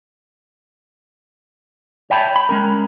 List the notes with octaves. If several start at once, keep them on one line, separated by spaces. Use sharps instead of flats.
C#5 E5 G5 A5 B5
B5
G#3 C#4 A#4